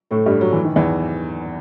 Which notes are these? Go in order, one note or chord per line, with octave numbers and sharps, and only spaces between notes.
A2 A3
G2 G3
F#3
E3
D#3
E2 E3